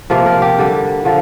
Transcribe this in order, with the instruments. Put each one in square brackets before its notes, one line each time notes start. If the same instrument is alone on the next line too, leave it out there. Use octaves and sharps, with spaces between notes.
[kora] C3 F3 A#3 C5
A#4
G4
D3 G3 D4
D3 F3